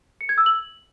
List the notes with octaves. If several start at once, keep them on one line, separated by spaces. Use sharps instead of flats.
C#7
G#6
E6
F#7